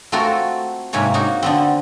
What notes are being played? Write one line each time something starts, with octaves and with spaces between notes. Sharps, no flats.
A3 C4 F4 F#4 A4 A#4
G#2 C3 G#3 A#3 C#5
A#3 D#4 F#4
D3 B3 C4